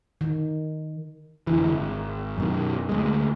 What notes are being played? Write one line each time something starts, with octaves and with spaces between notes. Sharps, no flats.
D#3
F1 D3 E3
G#1
F#2 B2 D#3
D2 G#3